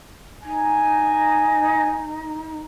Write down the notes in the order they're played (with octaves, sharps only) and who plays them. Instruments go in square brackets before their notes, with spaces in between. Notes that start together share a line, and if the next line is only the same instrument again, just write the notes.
[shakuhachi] D#4 [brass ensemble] G#5